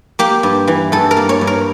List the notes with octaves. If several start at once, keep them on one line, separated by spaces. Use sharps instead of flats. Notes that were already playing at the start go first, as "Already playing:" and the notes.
A#3 G4
G2
E3
G2 A4
A#4
A#3
C#5
G2
A#4